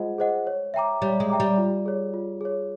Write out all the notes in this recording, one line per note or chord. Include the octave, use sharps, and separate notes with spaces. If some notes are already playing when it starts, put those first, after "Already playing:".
Already playing: G#3 F4 G#4 C5 D#5 F#5
G#4 C5 D#5 F#5
C#5
E5 G5 A#5 D6
G3 C#5
G#3
E5 G5 A#5 D6
G3
F4
G#4 C#5
F4
G#4 C#5